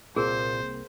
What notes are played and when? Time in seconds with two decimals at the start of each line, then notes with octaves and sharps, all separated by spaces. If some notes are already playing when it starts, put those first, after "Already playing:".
0.16 C2 A#2 A#3 C4 G#4 A#4 C5